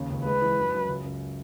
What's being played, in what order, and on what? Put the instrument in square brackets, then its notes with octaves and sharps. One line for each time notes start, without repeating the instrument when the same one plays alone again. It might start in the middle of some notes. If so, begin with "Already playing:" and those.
Already playing: [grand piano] D#2 C#3
C#2
[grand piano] G#3 [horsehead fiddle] B4
[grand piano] E3
F#2
F#2
C#2
C#2